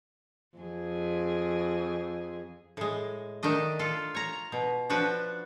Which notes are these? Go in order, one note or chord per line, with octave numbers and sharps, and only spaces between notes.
F2 G#4
A2 G#3
D#3 A3 D4 D#5
F4 A4
C#5 A#5
B2
F3 D4 F#4 B4